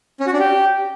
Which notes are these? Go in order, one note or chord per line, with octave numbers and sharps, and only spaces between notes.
C#4
F#4
D4
G4